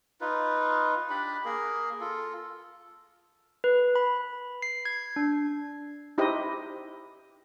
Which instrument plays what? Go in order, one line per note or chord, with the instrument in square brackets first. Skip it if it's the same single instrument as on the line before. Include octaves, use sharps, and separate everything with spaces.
[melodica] D#4 F4 B4
D4 G4 D5 B5
A#3 G#4 A#4
F4 A4
[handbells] B4
B5
C7
G#6
D4
[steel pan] D#4 E4 G4 C5 D#5